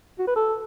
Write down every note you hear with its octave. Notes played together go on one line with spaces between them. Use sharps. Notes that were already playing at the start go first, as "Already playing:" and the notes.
F#4
B4
A4